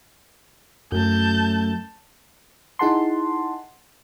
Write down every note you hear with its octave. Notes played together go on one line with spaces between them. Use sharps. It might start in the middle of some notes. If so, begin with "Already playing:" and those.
F#2 A3 A5 G6
D#4 E4 G#4 F#5 A5 C6